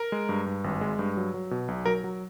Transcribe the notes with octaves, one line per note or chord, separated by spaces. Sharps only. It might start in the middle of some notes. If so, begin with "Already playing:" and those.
Already playing: A#4
G#3
G2
G2
G#1
G#3
G2
F#3
F#3
B2
B1
F#3 A#4
F#3